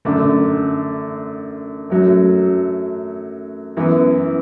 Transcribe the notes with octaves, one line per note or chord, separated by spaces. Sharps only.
F#2 D3 A3 D4
F#2 F#3 A3
F#2 E3 B3